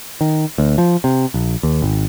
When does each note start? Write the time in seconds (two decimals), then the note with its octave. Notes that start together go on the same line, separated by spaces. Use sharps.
0.21 D#3
0.58 D2
0.78 F3
1.04 C3
1.34 A#1
1.63 D#2
1.82 G#1